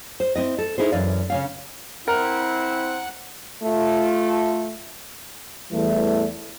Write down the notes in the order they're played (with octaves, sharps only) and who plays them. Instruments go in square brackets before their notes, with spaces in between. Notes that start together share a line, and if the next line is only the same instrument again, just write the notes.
[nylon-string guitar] C5
C4 E4 D#5
A4
D#4 E4 G#4 C5
F#2 E3 D5 F5
C#3 C#4 F5
[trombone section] C4 E4 [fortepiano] A#4 [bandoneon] F#5 F#6
[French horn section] A3 F4
E2 E3 G3 A3